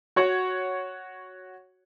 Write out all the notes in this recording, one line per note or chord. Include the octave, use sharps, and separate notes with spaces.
F#4 C#5 F#5